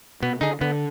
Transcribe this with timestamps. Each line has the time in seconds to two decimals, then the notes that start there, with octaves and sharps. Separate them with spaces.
0.22 B2 B3
0.41 D3 D#4 G#4
0.61 D3 B3